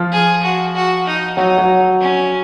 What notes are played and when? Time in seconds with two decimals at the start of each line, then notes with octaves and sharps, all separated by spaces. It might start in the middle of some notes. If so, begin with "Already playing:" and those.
Already playing: F3 F4
0.12 G#4
0.43 F#4
0.75 F#4
1.06 D#4
1.37 F#3 D#4 F#4
1.58 F#3 F#4
2.00 C#4